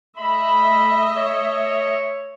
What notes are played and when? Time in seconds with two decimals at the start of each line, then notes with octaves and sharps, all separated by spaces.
0.17 A3 D#5 E5 B5
1.16 C#5